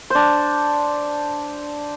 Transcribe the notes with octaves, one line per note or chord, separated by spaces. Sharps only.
D4 C5